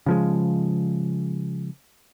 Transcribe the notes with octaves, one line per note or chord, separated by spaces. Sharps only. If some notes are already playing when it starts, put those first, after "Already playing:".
C#3 F3 G#3